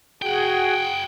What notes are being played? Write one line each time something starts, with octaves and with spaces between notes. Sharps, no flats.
F#4 G#4 F#5 G5